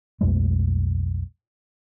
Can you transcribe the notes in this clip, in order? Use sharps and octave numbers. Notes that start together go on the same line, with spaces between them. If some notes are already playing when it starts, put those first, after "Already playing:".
B1 F2 G#3 A3